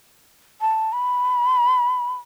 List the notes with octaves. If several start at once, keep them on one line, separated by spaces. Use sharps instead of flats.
A5
B5